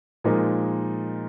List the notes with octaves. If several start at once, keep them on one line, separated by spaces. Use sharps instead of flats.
A#2 F3 G#3 D#4 A#4